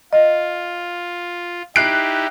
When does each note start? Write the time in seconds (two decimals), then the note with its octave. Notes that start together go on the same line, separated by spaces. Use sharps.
0.13 F4 D#5
1.76 D#4 E4 G4 F#6 C7 D7